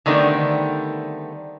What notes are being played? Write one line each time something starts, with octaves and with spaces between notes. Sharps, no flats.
D3 D#3 G3 A3 B3 C4